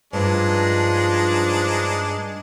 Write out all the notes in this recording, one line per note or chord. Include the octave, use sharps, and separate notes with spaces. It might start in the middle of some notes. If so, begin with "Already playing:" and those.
G2 F3 G#3 D4 D#4